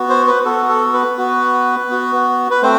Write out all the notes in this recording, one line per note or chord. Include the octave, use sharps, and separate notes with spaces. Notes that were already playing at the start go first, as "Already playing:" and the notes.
Already playing: B3 F#4
C5
B4
B3 F#4 A4
A4
B4
B3 F#4
B3 F#4
B4
A3 C4 C5